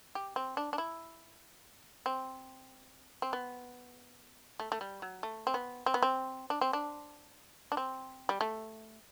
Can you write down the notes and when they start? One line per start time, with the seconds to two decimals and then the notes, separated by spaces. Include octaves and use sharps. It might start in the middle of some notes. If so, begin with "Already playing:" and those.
0.15 G4
0.36 C4
0.57 D4
0.73 D4
0.78 E4
2.06 C4
3.22 C4
3.33 B3
4.60 A3
4.72 A3
4.81 G3
5.02 F#3
5.23 A3
5.47 C4
5.54 B3
5.86 C4
5.94 B3
6.03 C4
6.50 D4
6.61 C4
6.73 D4
7.72 D4
7.77 C4
8.29 G3
8.41 A3